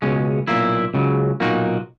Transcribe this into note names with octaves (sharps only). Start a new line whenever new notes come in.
C#2 B2 G#3 C#4
B1 A#2 A#3 E4
C#2 C#3 F#3
B1 A#2 A#3 D#4 F#4